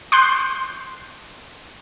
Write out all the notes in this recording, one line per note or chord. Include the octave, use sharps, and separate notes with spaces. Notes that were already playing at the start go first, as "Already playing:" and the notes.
C6 C#6 F#6 G6 C7